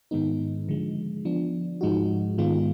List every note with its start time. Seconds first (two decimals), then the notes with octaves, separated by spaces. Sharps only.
0.11 G#2 D#3 G#3 B3 D#4
0.69 D3 F3 G#3
1.25 F3 B3 D4
1.81 G#2 F3 G#3 D#4 F#4
2.38 G#2 D#3 G#3 B3 F4